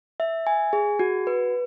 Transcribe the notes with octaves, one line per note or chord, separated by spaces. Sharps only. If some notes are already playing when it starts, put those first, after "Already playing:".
E5
G#5
G#4
F#4
B4